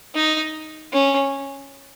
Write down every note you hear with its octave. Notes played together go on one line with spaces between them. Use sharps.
D#4
C#4